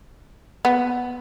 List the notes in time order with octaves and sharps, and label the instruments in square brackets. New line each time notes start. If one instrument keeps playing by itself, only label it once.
[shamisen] B3